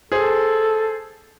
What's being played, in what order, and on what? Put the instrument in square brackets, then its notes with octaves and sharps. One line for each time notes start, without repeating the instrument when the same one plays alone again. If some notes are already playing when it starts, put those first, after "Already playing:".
[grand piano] G#4 C5 [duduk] A4